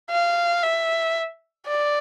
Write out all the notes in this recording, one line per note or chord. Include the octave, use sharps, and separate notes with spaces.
F5
E5
D5